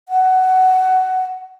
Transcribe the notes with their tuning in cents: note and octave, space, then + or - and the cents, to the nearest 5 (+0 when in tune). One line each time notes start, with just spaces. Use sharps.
F#5 +15